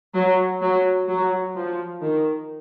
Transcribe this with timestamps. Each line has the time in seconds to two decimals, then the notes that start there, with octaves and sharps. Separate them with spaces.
0.14 F#3
0.61 F#3
1.08 F#3
1.55 F3
2.02 D#3